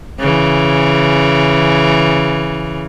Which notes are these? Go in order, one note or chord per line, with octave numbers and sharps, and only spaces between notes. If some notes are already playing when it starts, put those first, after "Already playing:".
C#3 E3